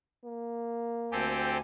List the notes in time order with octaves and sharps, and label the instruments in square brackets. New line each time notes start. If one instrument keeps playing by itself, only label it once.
[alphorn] A#3
[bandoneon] D2 G#5 [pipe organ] C4 G4 A4